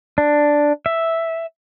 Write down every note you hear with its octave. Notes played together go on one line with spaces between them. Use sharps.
D4
E5